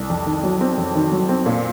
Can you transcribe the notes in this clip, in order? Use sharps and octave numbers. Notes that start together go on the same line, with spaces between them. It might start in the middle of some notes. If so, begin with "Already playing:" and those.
Already playing: C2
F2
D#3
F#3
C4
F2
D#3
F#3
C4
A#2